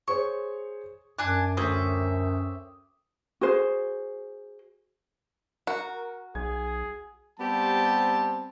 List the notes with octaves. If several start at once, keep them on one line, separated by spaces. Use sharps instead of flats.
G#4 C5 C#5 C#6
F#2 D4 G#5 D6 F#6
D2 C4 C#4 E5 D#6
F#4 G#4 C5
F#4 A#4
B1 G#4 G#6
G3 B3 C4 G4 C5 A5